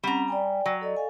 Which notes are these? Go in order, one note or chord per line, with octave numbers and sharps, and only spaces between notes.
G3 C4 C#4 F#5 A#5
D5 G5 G#5
F#3
A4 D5 D#5
A4 F5 G#5